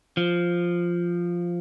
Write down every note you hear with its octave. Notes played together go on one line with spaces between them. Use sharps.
F3